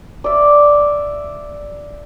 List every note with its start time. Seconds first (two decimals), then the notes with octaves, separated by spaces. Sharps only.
0.24 D5 E5